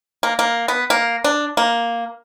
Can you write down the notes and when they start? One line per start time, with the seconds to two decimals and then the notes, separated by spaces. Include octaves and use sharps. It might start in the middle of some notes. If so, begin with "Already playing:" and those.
0.23 A#3
0.39 A#3
0.68 B3
0.90 A#3
1.24 D4
1.57 A#3